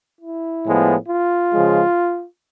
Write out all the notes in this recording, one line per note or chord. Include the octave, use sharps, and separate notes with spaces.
E4
A2 F3 G#3 B3
F4
C#3 F3 G#3